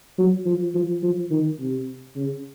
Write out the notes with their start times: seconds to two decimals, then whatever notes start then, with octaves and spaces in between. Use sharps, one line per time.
0.18 F#3
0.46 F3
0.75 F3
1.03 F3
1.31 D#3
1.60 C3
2.16 C#3